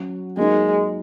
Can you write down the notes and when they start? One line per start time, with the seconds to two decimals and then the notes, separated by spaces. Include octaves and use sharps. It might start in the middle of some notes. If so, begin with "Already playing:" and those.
Already playing: F#3 C#4 F#4
0.37 F#3 G#3 A#3 D#4